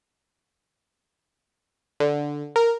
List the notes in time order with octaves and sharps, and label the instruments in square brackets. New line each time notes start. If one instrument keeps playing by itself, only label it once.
[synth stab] D3
A#4